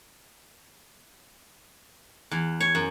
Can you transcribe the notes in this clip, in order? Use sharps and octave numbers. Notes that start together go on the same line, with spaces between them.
E2
C#5
F#2